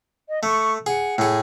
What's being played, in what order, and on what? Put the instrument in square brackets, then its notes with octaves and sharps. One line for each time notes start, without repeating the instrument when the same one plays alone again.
[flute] D#5
[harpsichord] A3 [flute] C#6
[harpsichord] G#4 [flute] F#5
[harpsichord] A2 G#4